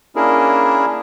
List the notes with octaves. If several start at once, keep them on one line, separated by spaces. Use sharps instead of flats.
A#3 C#4 D4 E4 G#4 A#4